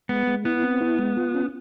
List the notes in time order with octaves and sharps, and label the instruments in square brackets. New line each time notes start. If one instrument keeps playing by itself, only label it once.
[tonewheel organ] G#3 [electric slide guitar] B3
[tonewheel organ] G#3
[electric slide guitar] B3 [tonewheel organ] E4
[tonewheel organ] C4
E4
G#3
F4
C#4